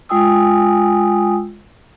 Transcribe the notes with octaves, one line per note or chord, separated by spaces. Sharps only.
G#3 F4 G5 G#5 D#6 E6